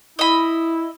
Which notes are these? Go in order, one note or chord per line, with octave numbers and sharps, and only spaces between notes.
E4 D#5 B5